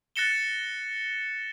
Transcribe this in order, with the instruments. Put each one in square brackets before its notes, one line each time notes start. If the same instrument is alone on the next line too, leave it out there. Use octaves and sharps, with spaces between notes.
[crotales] F#6 A6 A#6 C#7 E7 G7